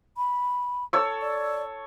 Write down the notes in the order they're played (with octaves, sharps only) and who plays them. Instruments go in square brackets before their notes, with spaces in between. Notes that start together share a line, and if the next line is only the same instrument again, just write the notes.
[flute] B5
[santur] A4 C#5 E6
[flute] D5